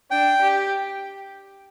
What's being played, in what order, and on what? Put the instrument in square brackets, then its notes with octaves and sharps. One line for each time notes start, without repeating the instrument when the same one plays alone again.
[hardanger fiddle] D4 [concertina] G5
[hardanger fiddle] G4